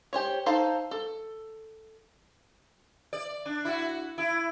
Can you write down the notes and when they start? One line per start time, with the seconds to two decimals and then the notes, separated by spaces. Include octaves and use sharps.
0.13 G4 C5 C#5
0.46 D#4 A4 C5 F5 A5
0.91 A4
3.13 D5
3.46 D4
3.65 E4 F#4
4.18 E4